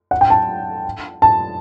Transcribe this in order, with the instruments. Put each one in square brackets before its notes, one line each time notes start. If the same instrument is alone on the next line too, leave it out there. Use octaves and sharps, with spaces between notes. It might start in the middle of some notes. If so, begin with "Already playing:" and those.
[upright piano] F#5
G5
A5
A5